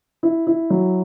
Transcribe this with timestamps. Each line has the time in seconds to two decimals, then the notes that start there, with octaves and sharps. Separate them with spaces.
0.23 E4
0.47 E4
0.70 F#3